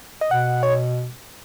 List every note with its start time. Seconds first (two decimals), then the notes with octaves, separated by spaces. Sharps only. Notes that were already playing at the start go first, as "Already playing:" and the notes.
0.21 D#5
0.31 B2 F#5
0.63 C#5